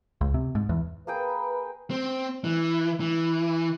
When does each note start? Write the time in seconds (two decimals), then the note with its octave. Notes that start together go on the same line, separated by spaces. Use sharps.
0.21 C#2
0.34 C3
0.55 G#2
0.69 E2
1.07 A#3 G#4 B4 G5
1.91 C4
2.44 E3
3.00 E3